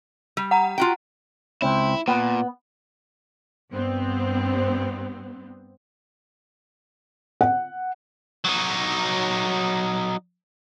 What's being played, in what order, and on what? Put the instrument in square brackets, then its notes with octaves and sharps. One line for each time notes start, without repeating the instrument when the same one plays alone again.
[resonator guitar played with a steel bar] G3
[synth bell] F#5 A#5
[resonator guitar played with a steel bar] F4 F#4 G5
[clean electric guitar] C#2 C4 [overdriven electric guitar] E4
[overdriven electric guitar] A#2 [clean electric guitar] B3
[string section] G2 B3 C4
[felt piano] F#5
[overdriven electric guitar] F#3 D#4